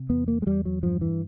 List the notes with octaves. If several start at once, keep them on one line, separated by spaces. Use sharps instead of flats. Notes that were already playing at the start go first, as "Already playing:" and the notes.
Already playing: C3
E2 B3
A#3
G#3
E2 G3
F#3
G2 F3
E3